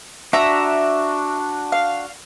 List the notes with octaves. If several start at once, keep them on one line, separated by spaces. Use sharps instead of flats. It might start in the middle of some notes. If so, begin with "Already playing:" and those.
D4 F#4 E5 A#5
F5